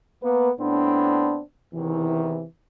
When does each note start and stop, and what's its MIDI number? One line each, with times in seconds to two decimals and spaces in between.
0.23 0.50 58
0.23 0.50 59
0.23 0.50 71
0.60 1.40 45
0.60 1.40 59
0.60 1.40 60
0.60 1.40 62
1.74 2.43 40
1.74 2.43 48
1.74 2.43 51
1.74 2.43 52